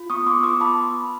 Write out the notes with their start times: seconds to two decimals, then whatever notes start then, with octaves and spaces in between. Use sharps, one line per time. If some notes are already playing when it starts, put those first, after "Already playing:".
Already playing: F4
0.10 B3 C#6 D#6
0.26 B3 C6 D6
0.43 F4 D6 E6
0.60 B3 A5 B5